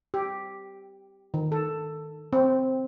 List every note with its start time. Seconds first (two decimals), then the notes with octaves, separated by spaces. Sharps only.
0.14 G4
1.34 D#3
1.52 A4
2.33 C4